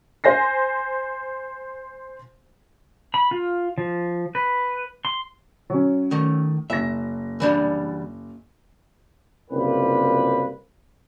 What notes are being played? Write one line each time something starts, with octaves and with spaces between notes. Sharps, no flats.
C5 G#5 A#6 C7
B5
F4
F3
B4
C6
F#3 C#4
D#3 A3
F#1 E5 A#6
E3 G3 D4
F#1 C2 F4 G4 B4